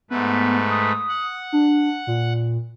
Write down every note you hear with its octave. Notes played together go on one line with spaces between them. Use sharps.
G#2 A3 B3 B4
D#6
F#5
D4
A#2